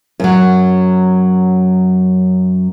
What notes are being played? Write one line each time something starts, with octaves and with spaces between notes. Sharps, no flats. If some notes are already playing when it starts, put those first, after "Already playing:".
F#2 F#3